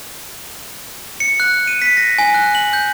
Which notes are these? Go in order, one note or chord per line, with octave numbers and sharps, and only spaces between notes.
C#7
F#6
D#7
B6
A#6
G#5
F#6
F#7
G6